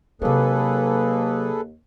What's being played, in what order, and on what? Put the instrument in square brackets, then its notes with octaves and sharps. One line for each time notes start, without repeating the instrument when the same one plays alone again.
[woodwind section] D#2 A#3 [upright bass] C3 F#3 [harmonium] G#4 A4 B4